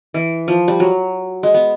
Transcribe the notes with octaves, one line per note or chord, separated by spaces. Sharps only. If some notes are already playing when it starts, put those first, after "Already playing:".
E3
F3
G3
F#3
G#3
B3